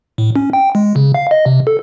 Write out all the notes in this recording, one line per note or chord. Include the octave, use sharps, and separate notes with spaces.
A2
C#4
G5
G#3
C#3
F5
D#5
C3
A4